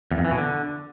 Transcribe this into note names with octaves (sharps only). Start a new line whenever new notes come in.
E2
F2
E3
B2
D3